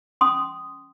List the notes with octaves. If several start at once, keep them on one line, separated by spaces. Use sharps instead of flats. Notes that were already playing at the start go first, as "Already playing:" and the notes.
C#4 C6 D#6